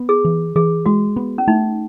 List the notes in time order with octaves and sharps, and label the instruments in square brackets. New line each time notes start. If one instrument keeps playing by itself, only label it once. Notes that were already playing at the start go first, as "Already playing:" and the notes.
Already playing: [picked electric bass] B3
[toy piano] G#4
[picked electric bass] E3
[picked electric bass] E3 [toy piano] G#4
[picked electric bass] G#3 [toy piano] F#4
[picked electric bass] B3
[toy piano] C#4
[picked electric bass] A3 [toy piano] D#4